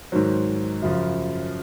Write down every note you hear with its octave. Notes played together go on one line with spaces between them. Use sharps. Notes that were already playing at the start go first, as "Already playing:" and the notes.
G#2 D#3 F#3 C5
F#2 C#3 F3